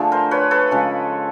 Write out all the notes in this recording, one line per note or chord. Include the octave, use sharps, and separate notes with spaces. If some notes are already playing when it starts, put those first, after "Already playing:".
Already playing: D3 F3 A3 G#4
A#4 C5
B4 C#5
A4 B4
C#3 F3 G#3